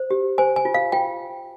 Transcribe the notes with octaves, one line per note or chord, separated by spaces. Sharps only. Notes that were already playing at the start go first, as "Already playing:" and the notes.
Already playing: C5
G4
C5 G#5
G#5
F4
F5
F4 G5